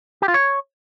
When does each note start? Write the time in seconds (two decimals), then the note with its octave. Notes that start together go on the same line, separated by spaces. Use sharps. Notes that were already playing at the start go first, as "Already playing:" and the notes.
0.22 G4
0.28 F4
0.34 C#5